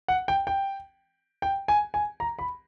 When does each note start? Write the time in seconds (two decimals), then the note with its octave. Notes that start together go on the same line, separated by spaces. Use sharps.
0.08 F#5
0.28 G5
0.47 G5
1.42 G5
1.68 G#5
1.94 G#5
2.20 A#5
2.39 B5